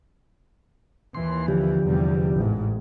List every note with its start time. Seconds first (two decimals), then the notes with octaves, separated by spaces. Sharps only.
1.15 D#2 E3 C6
1.48 D3 F3 G4
1.85 E2 C3 G3
2.36 A1 G#2